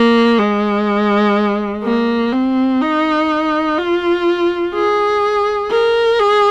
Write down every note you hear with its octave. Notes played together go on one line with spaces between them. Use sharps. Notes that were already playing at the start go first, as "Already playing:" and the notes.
Already playing: A#3
G#3
A#3
C4
D#4
F4
G#4
A#4
G#4